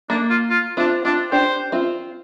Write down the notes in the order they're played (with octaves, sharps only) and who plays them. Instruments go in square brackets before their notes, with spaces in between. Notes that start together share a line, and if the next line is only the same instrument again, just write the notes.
[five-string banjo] A#3 [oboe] D4
[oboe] F4
F4
[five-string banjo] C4 F4 [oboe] D4
[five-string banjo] C4 F4 [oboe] D4
[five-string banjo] D4 G4 [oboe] C5
[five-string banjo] C4 F4